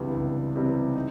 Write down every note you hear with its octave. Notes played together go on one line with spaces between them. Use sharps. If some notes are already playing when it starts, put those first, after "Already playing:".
Already playing: C#2 C3 E3 G3 B3 D4
C#2
C3 E3 G3 B3
D#4